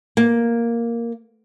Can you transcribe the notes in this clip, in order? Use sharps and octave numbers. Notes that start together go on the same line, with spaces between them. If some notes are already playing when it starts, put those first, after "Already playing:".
A#3